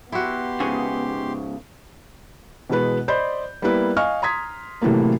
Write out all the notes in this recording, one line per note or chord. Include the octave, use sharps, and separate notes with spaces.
B3 E4 F#4 G4 C6
G#2 C#3 G#4 C#5
B2 E3 G#3 B3 B4
C5 D5 D#5 B5 G6
G3 A#3 B3 E4 B4
D#5 F5 G#5 C#6 F6
A#5 C6 D#6 G#6 B6
A2 C3 E3 F#3 A3 A#3